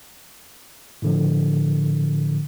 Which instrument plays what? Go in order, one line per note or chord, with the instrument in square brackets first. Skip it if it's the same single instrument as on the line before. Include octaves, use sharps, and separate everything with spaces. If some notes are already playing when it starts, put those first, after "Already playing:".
[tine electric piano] A2 D3 F3